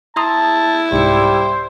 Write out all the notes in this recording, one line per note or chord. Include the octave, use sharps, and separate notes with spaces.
E4 A5 A#5 C6 D#6
C2 G#2 G3 C5 C#7